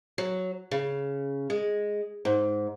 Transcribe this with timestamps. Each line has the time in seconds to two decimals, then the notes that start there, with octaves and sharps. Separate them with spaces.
0.18 F#3
0.71 C#3
1.50 G#3
2.25 G#2